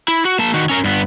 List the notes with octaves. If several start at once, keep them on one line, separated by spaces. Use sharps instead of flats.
E4
F#4
A#3 A5
D#3 F#4
C#4 A#4
G2 B3